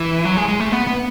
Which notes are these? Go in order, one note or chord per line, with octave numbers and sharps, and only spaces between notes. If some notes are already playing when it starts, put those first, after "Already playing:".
Already playing: E3
F#3
G#3
G#3
A3
B3
B3